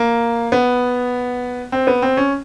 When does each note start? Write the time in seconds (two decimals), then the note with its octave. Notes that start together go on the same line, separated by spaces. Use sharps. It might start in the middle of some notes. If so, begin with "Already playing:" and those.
Already playing: A#3
0.52 B3
1.72 C4
1.87 B3
2.02 C4
2.17 C#4